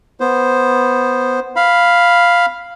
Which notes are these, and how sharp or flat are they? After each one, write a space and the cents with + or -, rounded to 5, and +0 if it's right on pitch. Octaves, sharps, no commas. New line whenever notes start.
B3 +0 C5 +0
F5 +0 B5 +0